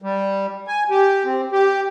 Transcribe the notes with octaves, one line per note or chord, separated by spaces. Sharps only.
G3
G#5
G4
C4
G4